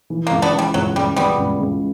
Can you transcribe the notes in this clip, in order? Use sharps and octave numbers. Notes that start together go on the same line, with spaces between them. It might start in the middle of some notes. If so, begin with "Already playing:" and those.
E3
A#3
C#2
B3 D4
E3
G3
C#2 F#3
C#2 G3
C#2 G3 B3
C#2
C#2